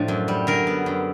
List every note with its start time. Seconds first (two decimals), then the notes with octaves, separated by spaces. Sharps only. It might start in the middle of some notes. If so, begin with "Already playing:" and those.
Already playing: A2 F3 A3 D4
0.08 F#2
0.28 G3
0.47 D3 A#4
0.67 B3
0.86 F#2